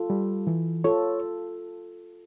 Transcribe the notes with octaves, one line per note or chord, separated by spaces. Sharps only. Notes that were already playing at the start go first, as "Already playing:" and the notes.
Already playing: F4 A4
G3
E3
F4 A4 C#5